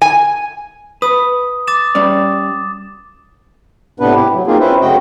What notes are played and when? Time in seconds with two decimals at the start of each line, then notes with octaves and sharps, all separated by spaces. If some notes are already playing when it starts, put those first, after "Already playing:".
0.02 G#5
1.02 B4 D#6
1.67 D6 A6 E7
1.95 G3 C#4 D5
4.00 A2 C3 B3 D4 B4
4.15 E4 G4
4.33 F#3
4.47 A#3 C4 D#4 F4 G#4
4.60 C4 C#4 E4 B4 C5 E5
4.81 F#2 C#3 A3 F#4 D#5 G5